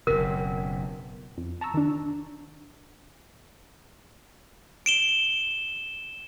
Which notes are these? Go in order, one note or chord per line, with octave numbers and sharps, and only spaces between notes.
F#1 B2 A#4
F2
A5 A#5 C#6 E6
D#3 D4
D7 E7 G7